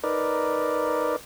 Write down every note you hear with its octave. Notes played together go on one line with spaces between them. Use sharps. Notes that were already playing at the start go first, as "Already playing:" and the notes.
D#4 A#4 B4 D5